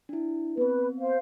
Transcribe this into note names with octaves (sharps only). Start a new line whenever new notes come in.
D4 E4
B3 C4 B4
C5 F5